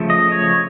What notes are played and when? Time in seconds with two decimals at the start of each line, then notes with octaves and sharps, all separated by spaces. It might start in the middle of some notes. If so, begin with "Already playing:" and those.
Already playing: C#3 F3 A3
0.10 D#5
0.32 C#5